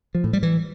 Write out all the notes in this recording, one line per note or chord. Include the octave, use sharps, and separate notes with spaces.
F3
A2
G3
E3